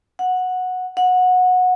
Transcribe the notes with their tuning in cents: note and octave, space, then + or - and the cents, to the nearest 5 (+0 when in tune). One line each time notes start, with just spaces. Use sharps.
F#5 -10
F#5 -20